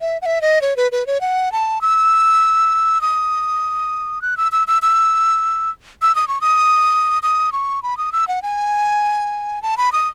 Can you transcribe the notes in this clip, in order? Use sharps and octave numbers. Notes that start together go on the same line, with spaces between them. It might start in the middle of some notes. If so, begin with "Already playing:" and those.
E5
F#5
E5
D#5
C#5
B4
B4
C#5
F#5
A5
E6
D#6
F#6
E6
E6
E6
E6
E6
D#6
C#6
D#6
D#6
C#6
B5
D#6
E6
F#5
G#5
A5
B5
D#6